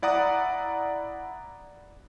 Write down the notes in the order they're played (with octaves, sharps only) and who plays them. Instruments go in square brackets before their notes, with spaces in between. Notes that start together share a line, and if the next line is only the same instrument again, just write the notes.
[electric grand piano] E4 D5 F#5 A#5 D#6